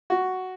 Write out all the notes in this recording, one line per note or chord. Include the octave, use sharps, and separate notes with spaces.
F#4